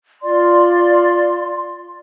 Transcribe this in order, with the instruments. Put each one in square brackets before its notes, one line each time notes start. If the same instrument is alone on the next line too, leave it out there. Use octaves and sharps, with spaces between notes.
[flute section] F4 D5 C6